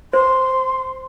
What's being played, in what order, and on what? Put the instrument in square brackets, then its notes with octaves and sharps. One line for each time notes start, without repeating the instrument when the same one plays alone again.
[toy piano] C5 [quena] C6